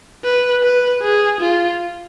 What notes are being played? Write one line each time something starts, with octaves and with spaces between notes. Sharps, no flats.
B4
B4
G#4
F4